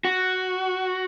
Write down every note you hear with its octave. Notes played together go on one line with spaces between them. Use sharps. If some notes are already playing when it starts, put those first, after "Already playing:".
F#4